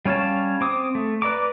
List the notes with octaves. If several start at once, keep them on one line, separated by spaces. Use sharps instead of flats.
G3 C#4 C#5 F5 A5
C4 D6 D#6
A3
B4 D5 A#5 D6